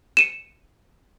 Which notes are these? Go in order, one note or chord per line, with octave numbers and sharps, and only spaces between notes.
C#7 D#7 E7